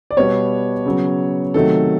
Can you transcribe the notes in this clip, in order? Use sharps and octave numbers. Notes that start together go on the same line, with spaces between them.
D5
B2 G3 B3 C#5
C#3 F#3 B3
C3 D#3 F#3 A3 A4